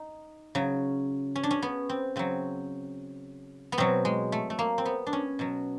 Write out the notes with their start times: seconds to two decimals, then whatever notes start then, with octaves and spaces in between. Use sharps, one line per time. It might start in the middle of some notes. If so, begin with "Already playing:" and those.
Already playing: D#4
0.55 C#3 F#3
1.36 C#4
1.43 D4
1.51 C#4
1.62 B3
1.89 C4
2.16 C#3 F#3 C4
3.72 B3
3.78 B2 F#3 C4
4.05 G#3
4.32 A3
4.50 A3
4.59 A#3
4.78 C4
4.85 B3
5.07 D4
5.13 C#4
5.39 B2 F#3